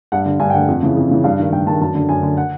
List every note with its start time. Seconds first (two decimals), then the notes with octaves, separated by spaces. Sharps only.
0.12 G2 F#5
0.25 D3
0.39 G2 G#5
0.50 G5
0.54 D3 F#5
0.68 F2
0.83 C#3 E3
0.97 F2
1.11 C#3 E3
1.24 G2 F5
1.39 D#3
1.52 G2 G5
1.66 D#3 A5
1.81 F#2 A5
1.95 D3
2.09 F#2 G#5
2.23 D3
2.37 F#5